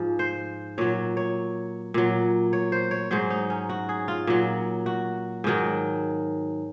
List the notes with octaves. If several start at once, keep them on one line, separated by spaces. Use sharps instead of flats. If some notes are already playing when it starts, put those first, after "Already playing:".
Already playing: G#2 F3
C5
A#2 F#3 C#5
C#5
A#2 F#3
C#5
C5
C#5
G#2 F#3 C5
D#4
C#4
F#4
G#4
F4
A#2 F#3
F#4
G#2 D#3 F#3